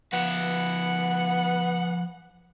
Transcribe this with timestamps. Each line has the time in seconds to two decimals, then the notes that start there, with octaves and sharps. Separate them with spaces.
0.13 F3 B3 B4 F#5